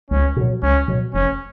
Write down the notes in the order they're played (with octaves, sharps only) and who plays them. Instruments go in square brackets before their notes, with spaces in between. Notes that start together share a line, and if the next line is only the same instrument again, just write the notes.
[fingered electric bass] C#2 [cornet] C#4
[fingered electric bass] B2 F#3
[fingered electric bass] C#2 [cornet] C#4
[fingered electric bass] B2 F#3
[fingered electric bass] F1 [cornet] C#4